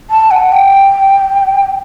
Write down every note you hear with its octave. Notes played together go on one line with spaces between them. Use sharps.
A5
F#5
G5